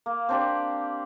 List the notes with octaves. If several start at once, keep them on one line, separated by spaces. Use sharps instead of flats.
A#3
C4 D4 G4